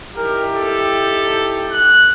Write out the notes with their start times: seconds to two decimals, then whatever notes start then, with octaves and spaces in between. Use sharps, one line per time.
0.17 D#4 E4 G4 A#4
0.56 A4
1.72 F#6